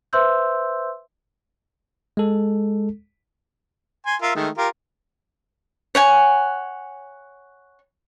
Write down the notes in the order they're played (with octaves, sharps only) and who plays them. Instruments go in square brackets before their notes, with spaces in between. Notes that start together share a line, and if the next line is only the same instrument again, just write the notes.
[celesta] B4 C5 E5 C6 E6 G6
[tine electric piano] G#3 A4
[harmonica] G#5 C6
F4 A#4 E5
D#3 G#3 A3
F4 G4 A#4
[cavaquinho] C#5 F#5 G#5